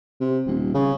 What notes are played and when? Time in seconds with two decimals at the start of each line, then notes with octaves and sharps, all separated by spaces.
0.21 C3
0.47 D#1
0.74 C#3